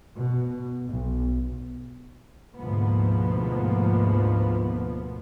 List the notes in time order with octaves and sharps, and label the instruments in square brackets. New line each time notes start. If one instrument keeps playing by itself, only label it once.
[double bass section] B2
B1
D2 G#2 B2 F3 A#3 B3